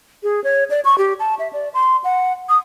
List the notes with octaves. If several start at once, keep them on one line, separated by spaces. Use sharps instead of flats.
G#4
C#5
D5
C#6
G4
A5
E5
D5
C6
F#5
D#6